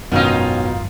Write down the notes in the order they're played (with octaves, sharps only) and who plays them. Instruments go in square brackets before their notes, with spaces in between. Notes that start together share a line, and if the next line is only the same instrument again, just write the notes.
[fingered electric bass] G#1 F#2 [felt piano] B2 [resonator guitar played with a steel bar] D#3 C#4 [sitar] A#3 D#4 F4